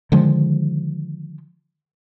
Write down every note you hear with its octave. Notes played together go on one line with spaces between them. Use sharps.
D3 D#3 F3 G#3